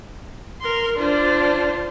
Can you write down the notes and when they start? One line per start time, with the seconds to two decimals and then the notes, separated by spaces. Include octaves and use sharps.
0.61 A#4 C6
0.99 D4 F4 C5